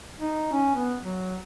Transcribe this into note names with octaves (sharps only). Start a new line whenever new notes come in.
D#4
C#4
B3
F#3